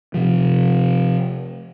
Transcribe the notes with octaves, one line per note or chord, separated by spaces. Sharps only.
C3 F3